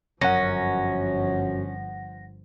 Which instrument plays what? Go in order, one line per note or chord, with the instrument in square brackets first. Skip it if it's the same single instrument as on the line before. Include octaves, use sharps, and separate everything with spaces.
[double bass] G1 F3 [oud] F#2 [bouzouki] C#4 [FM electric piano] F#5 A#6